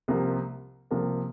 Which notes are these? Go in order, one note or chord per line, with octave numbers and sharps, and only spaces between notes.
C2 C3 F3 A#3
C2 C3 F3 A#3